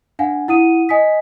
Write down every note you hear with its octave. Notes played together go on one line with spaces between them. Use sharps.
D4 F5 F#5 G#5
E4 F#5 D#6 D#7
D#5 G#5 D#6 B6